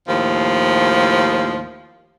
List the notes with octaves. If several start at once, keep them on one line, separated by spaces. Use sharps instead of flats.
D#2 A2 F3